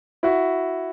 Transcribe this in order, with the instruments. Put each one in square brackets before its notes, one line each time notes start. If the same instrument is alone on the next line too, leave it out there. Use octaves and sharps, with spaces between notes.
[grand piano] E4 F#4